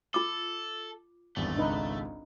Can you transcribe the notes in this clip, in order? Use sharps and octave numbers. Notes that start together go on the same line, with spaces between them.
F4 A4 D6
G#1 E2 G2 A3
G#1 C#2 D4 D#4 B4